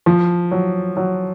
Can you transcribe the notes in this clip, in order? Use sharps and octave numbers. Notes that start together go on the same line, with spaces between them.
F3
F#3
F#3